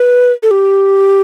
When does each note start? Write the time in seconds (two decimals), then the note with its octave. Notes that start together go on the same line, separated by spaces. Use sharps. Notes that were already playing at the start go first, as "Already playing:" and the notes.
Already playing: B4
0.43 A4
0.51 G4